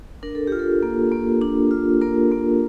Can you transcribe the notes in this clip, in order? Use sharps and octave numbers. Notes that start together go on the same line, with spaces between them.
D4 A#4
A4
F4 G4
A4
A#3
A#3
D4
F4
A#3 A#4
A#3